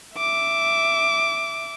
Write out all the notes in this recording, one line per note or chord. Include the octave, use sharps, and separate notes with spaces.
E5 D6